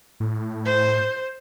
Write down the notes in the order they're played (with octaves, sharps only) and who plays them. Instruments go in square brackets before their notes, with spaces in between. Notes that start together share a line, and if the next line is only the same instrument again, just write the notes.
[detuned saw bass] A2
[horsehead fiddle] C5